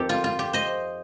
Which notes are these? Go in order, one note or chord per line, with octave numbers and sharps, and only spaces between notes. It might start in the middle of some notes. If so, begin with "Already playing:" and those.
Already playing: F2 D#3 G4 A4 C5
F4
F4
G4
C5 D#5